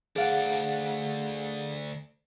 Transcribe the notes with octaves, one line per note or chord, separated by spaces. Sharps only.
D2 G#4 D5 F5 F#5